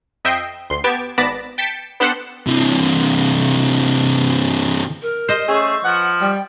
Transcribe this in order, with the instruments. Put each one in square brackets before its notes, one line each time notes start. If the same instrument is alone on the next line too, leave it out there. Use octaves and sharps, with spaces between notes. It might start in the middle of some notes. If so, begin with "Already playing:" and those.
[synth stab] F2 D#5 E5 G5 C7
D2 C6
B3 G4 A5 G#6 D7
G#1 B3 D5 A5 B5 A#6
G5 A5 B6 C#7
B3 D4 G4 A4 C5 F#5
[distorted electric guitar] C3 E3
[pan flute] A#4
[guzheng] C5 D#5
[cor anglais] A3 [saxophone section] C#4 G#4 [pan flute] C#6
[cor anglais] F3 [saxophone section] B4 F#5
[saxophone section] G3 [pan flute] G5